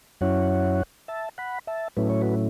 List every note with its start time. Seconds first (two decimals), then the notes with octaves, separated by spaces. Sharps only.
0.21 F#2 F#3 C#4 E4 C#5 F#5
1.08 E5 A5
1.38 F#5 B5
1.67 E5 A5
1.97 A2 F#3 A3 C#4 E4 B4
2.10 C#5
2.21 F#4 B4